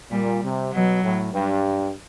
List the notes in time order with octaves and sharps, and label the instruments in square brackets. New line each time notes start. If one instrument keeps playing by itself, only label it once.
[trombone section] A#2 [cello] G3
[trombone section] C3
[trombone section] B2 [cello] F#3
[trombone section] A2
G2